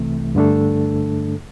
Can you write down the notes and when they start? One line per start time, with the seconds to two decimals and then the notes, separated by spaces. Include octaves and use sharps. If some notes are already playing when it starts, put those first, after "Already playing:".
Already playing: C2 C3 E3 A3
0.35 G2 D3 A3 D4 A4